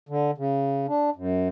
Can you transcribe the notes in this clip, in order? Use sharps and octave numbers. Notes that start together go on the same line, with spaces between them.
D3
C#3
D4
F#2